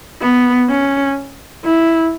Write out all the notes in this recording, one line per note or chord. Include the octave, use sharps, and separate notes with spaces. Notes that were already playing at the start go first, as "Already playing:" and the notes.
B3
C#4
E4